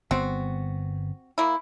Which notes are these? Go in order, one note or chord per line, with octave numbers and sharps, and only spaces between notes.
G1 B3 C4 F#4
A#3 E4